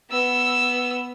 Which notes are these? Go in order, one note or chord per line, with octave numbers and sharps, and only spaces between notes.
B3 E6